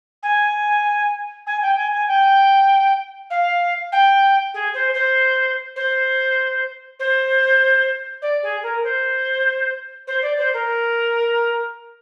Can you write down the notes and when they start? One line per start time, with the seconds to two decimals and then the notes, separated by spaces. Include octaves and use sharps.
0.22 G#5
1.46 G#5
1.61 G5
1.76 G#5
1.92 G#5
2.07 G5
3.30 F5
3.92 G5
4.54 G#4
4.73 C5
4.94 C5
5.76 C5
6.99 C5
8.21 D5
8.42 G#4
8.63 A#4
8.83 C5
10.07 C5
10.22 D5
10.38 C5
10.53 A#4